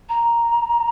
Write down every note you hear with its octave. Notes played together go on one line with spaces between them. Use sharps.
A#5